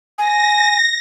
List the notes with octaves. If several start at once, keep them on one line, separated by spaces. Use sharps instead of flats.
G#5 A#6